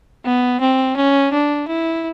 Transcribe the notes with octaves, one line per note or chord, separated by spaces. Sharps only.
B3
C4
C#4
D4
E4